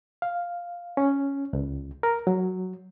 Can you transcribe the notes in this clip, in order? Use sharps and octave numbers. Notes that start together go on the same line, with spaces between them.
F5
C#4
C#2
A#4
F#3